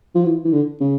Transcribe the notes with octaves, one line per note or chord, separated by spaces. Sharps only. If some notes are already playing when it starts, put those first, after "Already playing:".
F3
E3
E3
D3
C#3